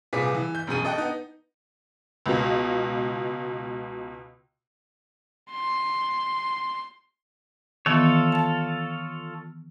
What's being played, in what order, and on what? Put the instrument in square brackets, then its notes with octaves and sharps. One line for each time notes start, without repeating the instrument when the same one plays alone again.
[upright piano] C2 A#2 G#4 B4 D6 B6
E3
G6
E1 F#2 G#4 D#7
A4 D#5 G5 F#6
B3 D#4
[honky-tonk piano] C#2 B2
[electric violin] C6
[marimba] D#3 E3 B3 [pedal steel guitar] F4 A4 C#5
[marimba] A5 A6